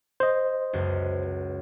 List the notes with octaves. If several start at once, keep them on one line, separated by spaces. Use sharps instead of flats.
C5 D#5
C#2 F#2 B3